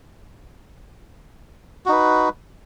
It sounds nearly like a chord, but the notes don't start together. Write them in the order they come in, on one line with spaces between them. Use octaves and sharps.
F#4 D#4 B4